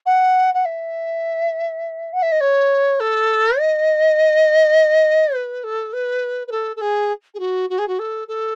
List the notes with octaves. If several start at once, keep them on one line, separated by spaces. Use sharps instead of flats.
F#5
F#5
E5
F#5
E5
D#5
C#5
A4
D#5
B4
A4
B4
B4
A4
A4
G#4
G#4
F#4
F#4
G#4
F#4
A4
A4